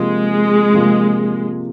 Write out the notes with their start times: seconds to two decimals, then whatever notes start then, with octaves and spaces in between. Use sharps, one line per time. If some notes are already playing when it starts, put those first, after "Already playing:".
Already playing: C3 F3 G#3 A#3 F4
0.73 C3 F3 A#3 F4